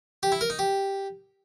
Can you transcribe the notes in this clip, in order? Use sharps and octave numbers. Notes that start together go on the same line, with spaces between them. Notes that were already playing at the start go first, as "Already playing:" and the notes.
G4
E4
A#4
D#4
G4